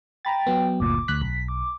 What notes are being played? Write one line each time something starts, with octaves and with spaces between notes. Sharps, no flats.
G5 A#5 B5 A6
F#3 B3
G1 D2 A#2 D6
D2 F#6 B6
B1 B6
D6